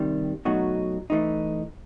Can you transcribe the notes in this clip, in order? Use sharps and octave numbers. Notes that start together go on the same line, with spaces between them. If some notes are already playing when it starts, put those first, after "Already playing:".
Already playing: C3 D#3 G3
B2 F#3 A3 D#4 F#4
E3 A3 D#4